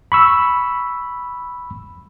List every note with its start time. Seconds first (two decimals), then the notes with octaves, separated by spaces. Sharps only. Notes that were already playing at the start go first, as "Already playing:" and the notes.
0.12 B5 C#6 E6